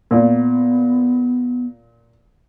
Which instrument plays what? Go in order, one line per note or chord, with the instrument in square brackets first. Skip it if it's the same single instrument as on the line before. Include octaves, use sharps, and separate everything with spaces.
[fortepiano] A#2 [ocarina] B3